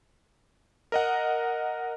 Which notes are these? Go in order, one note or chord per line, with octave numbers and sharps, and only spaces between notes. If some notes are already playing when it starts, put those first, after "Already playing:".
A#4 D#5 F#5